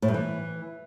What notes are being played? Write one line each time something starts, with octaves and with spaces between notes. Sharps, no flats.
A2
G2
E3